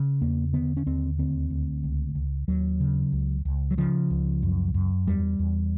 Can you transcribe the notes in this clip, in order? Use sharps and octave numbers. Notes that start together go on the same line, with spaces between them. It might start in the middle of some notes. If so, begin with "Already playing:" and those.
Already playing: C#3
E2 A#3
D3 B3
C#4
D#2 C4
D2 C4
D2
C#2
C#2
D#2 F#3
C#3
C#2
C#2
F#3
C#3 F3
C#2
F#2
F#2
E2 G3
E2